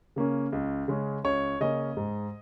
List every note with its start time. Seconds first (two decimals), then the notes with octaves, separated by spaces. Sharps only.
0.16 C#3 A#3 C#4
0.52 C#2
0.88 C#3 G#3 C#4
1.24 C#2 C#5
1.60 C#3 A#3 C#4 D#5
1.97 G#2